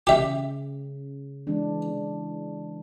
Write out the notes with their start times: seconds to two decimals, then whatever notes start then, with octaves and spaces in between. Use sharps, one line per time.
0.07 C#3 G4 E5
1.47 E3 G#3 D4